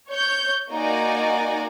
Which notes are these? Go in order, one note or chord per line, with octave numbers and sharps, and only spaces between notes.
C#5 G6
A#3 D#4 F#4 D5 G#5 A#5